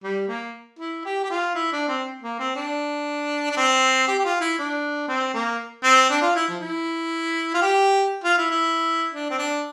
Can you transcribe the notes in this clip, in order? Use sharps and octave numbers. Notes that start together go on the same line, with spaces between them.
G3
A#3
E4
G4
G4
F4
E4
D4
C4
A#3
C4
D4
D4
C4
G4
G4
F4
E4
D4
C4
A#3
C4
D4
F4
E4
F3
E4
F4
G4
F4
E4
E4
D4
C4
D4